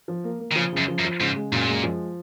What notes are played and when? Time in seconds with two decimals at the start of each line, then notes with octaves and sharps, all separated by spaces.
0.08 F3
0.24 A#3
0.40 A#3
0.51 D#3
0.56 C#3 F3
0.72 F#2 C#3
0.88 F3
0.99 F#2
1.05 F3
1.20 G#2 C#3
1.36 G#3
1.52 F#2 A#2
1.68 G#3
1.83 F3